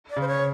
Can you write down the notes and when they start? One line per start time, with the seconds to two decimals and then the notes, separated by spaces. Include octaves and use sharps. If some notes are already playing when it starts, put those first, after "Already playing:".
0.10 D5
0.17 C#3
0.21 C5
0.28 C#5